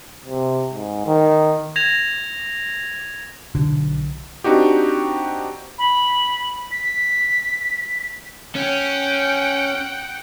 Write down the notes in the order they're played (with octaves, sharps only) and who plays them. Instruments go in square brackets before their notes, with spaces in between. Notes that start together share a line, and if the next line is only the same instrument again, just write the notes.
[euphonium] C3
G#2
D#3
[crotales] G#6 A#6 E7 F7
[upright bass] B1 [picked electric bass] D3
[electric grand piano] C4 D4 D#4 F#4 G4
[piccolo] B5
B6
[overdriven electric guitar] C#4 [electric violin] F#5 G5